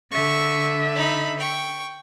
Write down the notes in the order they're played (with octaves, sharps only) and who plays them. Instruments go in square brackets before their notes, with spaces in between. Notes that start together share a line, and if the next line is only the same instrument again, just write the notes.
[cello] D3 E5 [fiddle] C#6
[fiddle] D#4 B5
G5 C#6